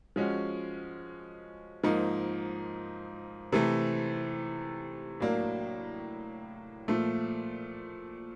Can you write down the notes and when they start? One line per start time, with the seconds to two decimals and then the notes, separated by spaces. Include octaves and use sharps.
0.16 F3 G#3 C#4 F#4
1.84 G#2 F3 A#3 D#4
3.52 C3 E3 A3
5.20 A2 F#3 A#3 D4
6.88 A#2 F3 A3